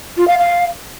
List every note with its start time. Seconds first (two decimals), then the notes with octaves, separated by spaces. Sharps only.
0.17 F4
0.27 F5
0.38 F5